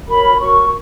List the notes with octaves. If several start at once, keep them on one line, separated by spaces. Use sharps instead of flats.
F#4 A#4 C#5 B5
B5
F#4 A#4 C#5 C#6